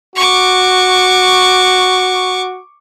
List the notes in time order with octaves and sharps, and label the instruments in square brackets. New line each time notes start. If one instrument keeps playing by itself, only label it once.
[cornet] F#4 [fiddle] C#6 D6